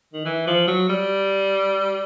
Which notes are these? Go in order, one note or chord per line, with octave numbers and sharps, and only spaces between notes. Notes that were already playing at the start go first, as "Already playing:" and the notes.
D#3
E3
F3
F#3
G3